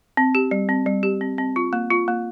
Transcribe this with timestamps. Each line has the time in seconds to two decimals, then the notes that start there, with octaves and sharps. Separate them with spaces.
0.17 C4
0.35 G4
0.51 G3
0.69 C4
0.86 G3
1.03 G4
1.21 C4
1.38 C4
1.56 F4
1.73 A#3
1.91 F4
2.08 A#3